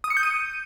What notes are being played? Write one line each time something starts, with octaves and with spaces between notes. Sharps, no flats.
D#6
C#7
G6
D#7